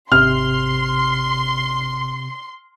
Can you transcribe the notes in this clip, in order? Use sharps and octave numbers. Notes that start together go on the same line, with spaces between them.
G#1 C3 C6 F6